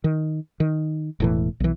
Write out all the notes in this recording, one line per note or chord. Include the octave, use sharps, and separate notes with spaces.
D#3
D#3
E1 A2 E3
B1 E3